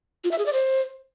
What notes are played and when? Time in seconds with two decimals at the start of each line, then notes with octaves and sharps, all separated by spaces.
0.24 F4
0.31 E5
0.39 G#4
0.46 D5
0.53 C5